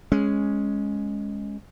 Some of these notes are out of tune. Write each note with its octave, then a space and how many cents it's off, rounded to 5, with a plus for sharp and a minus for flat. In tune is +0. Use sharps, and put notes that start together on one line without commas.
G#3 +0 C#4 +0